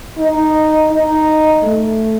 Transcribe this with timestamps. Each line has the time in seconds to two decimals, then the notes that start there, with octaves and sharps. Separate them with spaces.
0.18 D#4
0.91 D#4
1.63 A3